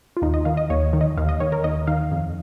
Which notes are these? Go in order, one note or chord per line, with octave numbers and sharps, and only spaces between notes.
F4
D#2 D#4
D#5
D#3 F5
D#5
D#2 C#5
D#3
D#5
D#2 F5
D#5
D#3 C#5
A#4
D#2 D#5
D#3 F5
F2